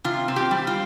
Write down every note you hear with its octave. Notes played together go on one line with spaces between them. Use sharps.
C3 F4
C4
G4
G3
F4